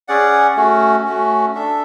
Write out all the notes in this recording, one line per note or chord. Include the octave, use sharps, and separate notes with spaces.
C#4 G#4 D5 F#5
A3 C#4 F#4
A3 C#4 F#4
D4 A4 E5